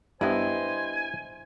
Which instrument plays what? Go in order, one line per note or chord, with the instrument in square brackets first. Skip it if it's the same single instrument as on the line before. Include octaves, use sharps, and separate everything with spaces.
[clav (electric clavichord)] G2 B3 [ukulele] E4 D#5 [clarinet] C5 [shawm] G#5